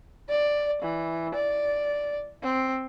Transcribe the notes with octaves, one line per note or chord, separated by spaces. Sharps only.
D5
E3
D5
C4